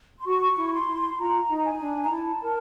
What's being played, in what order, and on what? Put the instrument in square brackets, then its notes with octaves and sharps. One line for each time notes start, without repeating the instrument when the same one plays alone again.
[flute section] C6
[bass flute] F#4 [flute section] C#6
[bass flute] E4
[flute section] C6
[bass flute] E4
[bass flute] F4 [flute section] A#5
[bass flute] D#4
[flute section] G#5
[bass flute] D4
[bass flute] D#4 [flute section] A#5
[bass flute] E4 [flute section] A5
[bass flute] A#4